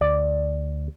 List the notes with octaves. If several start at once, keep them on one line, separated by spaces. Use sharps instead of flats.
D2 D5